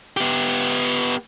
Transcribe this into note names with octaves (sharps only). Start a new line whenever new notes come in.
B3 G4